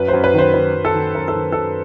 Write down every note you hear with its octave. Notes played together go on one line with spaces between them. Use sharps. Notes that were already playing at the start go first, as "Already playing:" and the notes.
Already playing: F#2 B4
C5
F#2
B4
D#3 C5
D#3 B4
F#2
A4
D#3
F#2 A#4
A4
D#3
F#2 A4